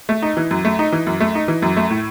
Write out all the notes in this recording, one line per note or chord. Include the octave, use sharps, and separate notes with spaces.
A3
D#4
E3
F#2
A3
D#4
E3
F#2
A3
D#4
E3
F#2
A3
A2